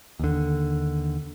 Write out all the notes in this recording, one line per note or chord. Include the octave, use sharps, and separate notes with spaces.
D#2 D3